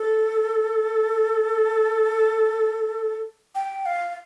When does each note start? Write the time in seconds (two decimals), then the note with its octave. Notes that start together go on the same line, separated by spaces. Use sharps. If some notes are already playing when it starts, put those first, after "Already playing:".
Already playing: A4
3.55 G5
3.86 F5